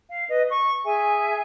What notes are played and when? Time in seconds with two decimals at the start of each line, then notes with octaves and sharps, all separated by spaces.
0.09 F5
0.30 B4 D#5
0.51 C#6
0.84 G#4 E5 G#5